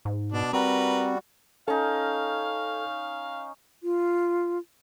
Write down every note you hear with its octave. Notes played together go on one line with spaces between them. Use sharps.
G#2
B2 D4
G3 C4 F#4 A#4 B4
C#4 D#4 A4 F5
F4